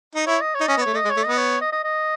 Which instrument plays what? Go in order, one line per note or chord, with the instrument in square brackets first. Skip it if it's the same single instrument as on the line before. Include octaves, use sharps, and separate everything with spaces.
[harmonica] D#4
[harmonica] E4 [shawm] C#5
[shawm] D#5
C#5
[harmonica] D#4
[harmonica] C#4 [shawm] D#5
[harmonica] B3
[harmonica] A3 [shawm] C#5
[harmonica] A3 [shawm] D#5
[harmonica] G#3
[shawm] C#5
[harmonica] A3
[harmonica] B3 [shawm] D#5
[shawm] C#5
D#5
D#5
D#5